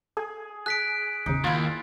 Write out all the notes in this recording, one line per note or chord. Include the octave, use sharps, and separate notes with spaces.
G#4 A4 G#5
G#4 F#6 B6 D7
A1 E2 C#3 D#4
D#2 E4 F4